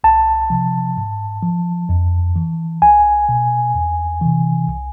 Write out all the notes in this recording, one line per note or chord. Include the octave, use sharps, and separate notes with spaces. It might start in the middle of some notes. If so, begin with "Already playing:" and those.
C2 A5
C3 F3
G#2
F3
F2
E3
C2 G#5
B2
E2
C3 E3
C2